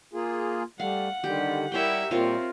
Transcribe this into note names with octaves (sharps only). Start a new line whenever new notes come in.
A#3 F4 G#4
G3 A3 F5 F#5
D3 D#3 G3 G4
G3 E4 G4 A#4 C#5 E5 G5
A#2 G3 C4 F4 A#4 C#5